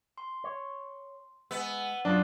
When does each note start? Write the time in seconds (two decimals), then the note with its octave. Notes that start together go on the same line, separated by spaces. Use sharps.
0.18 C6
0.44 C#5
1.51 G#3 B3 E6
2.05 F#2 F#3 D4 F4 D5 A5 D6 D#6